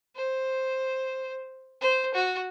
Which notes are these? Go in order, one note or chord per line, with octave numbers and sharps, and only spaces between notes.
C5
C5
F#4